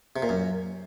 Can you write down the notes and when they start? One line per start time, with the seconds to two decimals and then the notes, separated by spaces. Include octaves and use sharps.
0.16 C3
0.22 A#2
0.29 F#2